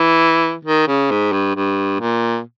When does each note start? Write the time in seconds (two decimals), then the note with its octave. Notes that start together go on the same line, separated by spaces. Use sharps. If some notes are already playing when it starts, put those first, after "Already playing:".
Already playing: E3
0.65 D#3
0.88 C#3
1.11 G#2
1.32 G2
1.55 G2
2.00 A#2